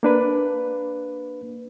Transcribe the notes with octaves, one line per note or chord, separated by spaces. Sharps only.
A#3 D4 B4